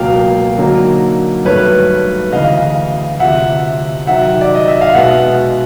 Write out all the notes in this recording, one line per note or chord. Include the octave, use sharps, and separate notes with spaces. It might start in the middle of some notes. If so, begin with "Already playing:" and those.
Already playing: C#2 B2 F#3 A#3 F5 G5
D3 F#3 A#3 D#4
G2 D#3 F#3 A3 B4 C#5
D2 C#3 E3 D#5 F5
D2 C3 F3 E5 F#5
C3 D#3 F#3 E5 F#5
D5
D#5
E5
F5
B2 G#3 B3 E5 F#5